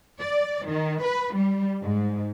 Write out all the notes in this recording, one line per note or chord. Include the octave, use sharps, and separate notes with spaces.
D5
D#3
B4
G3
G#2